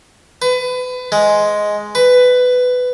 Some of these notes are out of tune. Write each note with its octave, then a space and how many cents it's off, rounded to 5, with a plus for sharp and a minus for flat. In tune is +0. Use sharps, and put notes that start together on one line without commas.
B4 +30
G#3 +5
B4 +15